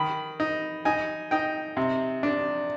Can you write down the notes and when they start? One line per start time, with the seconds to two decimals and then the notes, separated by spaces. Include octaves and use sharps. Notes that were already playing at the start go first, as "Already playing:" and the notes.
Already playing: D#3 B5
0.40 D#4
0.85 D#4 G#5
1.31 D#4 G5
1.77 C3
2.23 D4